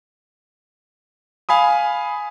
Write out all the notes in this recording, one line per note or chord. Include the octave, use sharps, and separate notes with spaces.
F5 G#5 B5 D#6